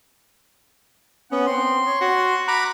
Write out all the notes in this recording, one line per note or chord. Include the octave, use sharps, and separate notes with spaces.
B3 C#4 F#5
C4 C6
C#5
F#4
A#5 B5 D6 F#6